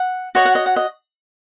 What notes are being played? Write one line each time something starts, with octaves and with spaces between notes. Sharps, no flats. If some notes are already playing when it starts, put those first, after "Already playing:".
Already playing: F#5
F#4 C#5 D#5
F#5
D#5
F#5
D#5